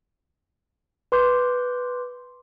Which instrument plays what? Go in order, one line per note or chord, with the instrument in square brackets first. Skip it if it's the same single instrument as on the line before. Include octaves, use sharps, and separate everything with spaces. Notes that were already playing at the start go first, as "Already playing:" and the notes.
[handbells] B4 C6 D6 G6